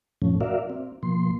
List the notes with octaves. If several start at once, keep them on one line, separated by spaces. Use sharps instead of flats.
F#2 A#2 F3 A3 C#4
F#4 A#4 D5 E5 F5
C4
B2 F3 A#3 C6